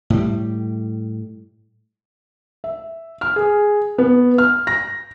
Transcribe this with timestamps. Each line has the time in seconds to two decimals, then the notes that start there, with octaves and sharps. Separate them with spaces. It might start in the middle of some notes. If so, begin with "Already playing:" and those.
0.10 A2 G3
2.64 E5
3.21 F6
3.36 G#4
3.98 B3
4.38 F6
4.67 A#6